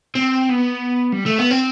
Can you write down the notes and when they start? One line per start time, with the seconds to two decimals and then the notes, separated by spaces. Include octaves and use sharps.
0.16 C4
0.50 B3
1.13 G3
1.26 A3
1.39 B3
1.51 C4